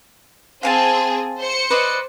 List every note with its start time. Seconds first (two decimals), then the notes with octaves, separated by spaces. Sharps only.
0.63 C4 G#4 F5 G#5 A5
1.39 C5 C#7
1.70 B4 D5 D#5